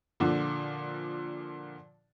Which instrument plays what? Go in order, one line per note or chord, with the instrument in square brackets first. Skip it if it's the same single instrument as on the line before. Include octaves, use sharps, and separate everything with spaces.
[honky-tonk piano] A#2 D3 F3